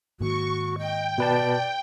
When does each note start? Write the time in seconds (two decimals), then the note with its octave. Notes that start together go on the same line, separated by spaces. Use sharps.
0.20 G#2 D#3 A#3 F#4 C#6
0.78 D#5 G5
1.18 B2 B4 D5 A5